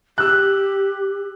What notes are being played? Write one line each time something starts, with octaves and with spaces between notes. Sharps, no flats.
G4 E6 F#6